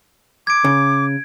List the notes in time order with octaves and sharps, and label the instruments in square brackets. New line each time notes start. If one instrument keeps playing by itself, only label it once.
[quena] D6 [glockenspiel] G#6 D7
[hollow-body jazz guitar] C#3